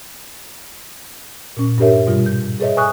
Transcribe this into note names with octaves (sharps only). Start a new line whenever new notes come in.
A#2 C#4
G2 D4 G4 A#4 C#5 E5
G#2 B2 G3 F4
G6
G#4 A4 B4 C#5 D#5 E5
B4 G#5 C#6 D#6 F#6